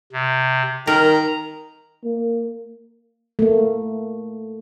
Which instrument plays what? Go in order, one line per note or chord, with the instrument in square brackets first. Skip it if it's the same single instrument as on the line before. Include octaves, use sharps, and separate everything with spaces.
[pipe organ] C3
[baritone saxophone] D#3 [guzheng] A#4 [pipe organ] A#5
[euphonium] A#3
[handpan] A3 A#3